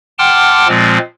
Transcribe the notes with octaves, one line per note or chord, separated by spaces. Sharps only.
F#5 G5 A5 C6 D6 F6
A#2 F3 G#3 C4